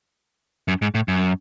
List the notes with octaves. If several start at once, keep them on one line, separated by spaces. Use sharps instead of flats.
F#2
G#2
A2
F#2